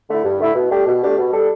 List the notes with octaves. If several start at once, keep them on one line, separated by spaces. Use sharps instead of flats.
D3 A3 E4
G2
D3 A3 E4
B2
A3 D4 G4
B2
A3 D4 G4
B2
G3 D4 A4